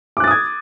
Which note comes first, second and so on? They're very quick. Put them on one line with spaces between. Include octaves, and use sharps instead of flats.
D6 F#6 A6 D#6 G#6